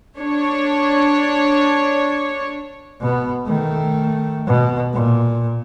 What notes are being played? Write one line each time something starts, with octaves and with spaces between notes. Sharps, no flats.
D4 C#5
B2 B3
D#3 A3
B2
A#2